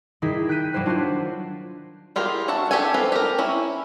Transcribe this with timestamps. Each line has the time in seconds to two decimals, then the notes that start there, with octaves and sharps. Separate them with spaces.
0.22 D#3 G3 D#4 E4 G#4 B6
0.48 G5 F#6 G6 B6 D#7
0.73 F#3 G3 E4 C5 F#6
0.86 D4 F4 F#4 C5
2.16 E4 F4 G4 G#4 A#4
2.48 F#4 E5 F#5 A5
2.71 D4 G4 A4 E5 G#5
2.94 C4 F4 A4 B4
3.12 G4 A#4
3.39 C#4 E4